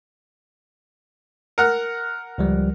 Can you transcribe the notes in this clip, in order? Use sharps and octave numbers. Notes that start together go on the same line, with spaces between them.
A#4 F#5 F6
C#2 F3 G3